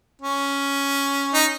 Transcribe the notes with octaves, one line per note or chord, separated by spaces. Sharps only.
C#4
D#4